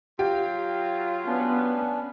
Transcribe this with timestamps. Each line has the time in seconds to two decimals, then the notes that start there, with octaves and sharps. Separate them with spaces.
0.19 F#3 F4 G4
1.26 B3 C#4 D4